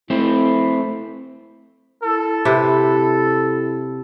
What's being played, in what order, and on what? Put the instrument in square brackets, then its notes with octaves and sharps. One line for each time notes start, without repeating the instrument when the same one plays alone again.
[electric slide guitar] A3 C4 [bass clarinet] E4
[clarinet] E4 [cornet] A4
[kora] C3 B4